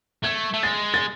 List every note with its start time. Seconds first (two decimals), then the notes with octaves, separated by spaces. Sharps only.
0.24 A3 G#6
0.54 A3
0.63 G#3 A6
0.94 A6